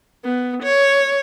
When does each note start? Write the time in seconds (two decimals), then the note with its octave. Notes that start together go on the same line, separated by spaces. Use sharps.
0.25 B3
0.63 C#5